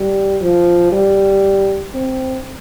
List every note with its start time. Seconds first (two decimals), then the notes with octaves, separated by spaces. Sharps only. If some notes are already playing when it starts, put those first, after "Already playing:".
Already playing: G3
0.41 F3
0.92 G3
1.94 C4